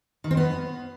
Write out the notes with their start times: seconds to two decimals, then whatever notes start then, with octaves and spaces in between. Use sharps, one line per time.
0.24 D#3
0.31 C4
0.37 B3